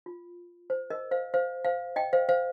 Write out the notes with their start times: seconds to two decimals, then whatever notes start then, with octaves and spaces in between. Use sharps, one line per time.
0.06 F4
0.70 C5
0.90 A#4 D#5
1.11 C5 F5
1.34 C5 F5
1.65 C5 F5
1.96 D#5 G5
2.13 C5 F5
2.29 C5 F5